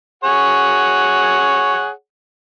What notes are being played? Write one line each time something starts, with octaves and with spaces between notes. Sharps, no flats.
G#4 C#5 F#5